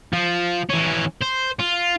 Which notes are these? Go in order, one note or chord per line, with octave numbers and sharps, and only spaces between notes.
F3
E3 C#4
C5
F4